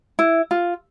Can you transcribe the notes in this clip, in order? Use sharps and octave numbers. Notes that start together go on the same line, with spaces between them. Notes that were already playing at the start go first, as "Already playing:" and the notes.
E4
F4